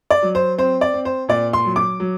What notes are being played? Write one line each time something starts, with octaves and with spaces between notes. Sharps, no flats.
D5
F#3
C5
C4 C5
D5
C4
C5
A#2 D5
C6
F#3
D6
F#3